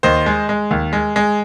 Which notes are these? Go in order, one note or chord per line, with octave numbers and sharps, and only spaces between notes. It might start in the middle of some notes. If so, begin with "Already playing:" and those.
D#2 C5 D#5
G#3
G#3
D#2
G#3
G#3